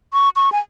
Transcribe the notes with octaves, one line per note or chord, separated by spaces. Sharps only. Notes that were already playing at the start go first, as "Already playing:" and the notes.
C#6
C#6
G#5